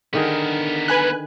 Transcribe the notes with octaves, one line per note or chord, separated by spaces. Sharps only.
D3 D#3 B3 G#4 A#4
B4 G#5 F#6